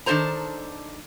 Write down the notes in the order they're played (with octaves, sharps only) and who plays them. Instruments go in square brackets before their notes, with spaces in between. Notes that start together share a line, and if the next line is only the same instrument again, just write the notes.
[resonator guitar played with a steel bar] D#3 D4 G4 A4 C5 A#5